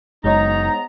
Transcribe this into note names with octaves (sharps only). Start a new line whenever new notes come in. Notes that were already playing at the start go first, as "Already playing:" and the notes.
F#1 G#2 G#3 B3 D#4 C#5 D#5 A#5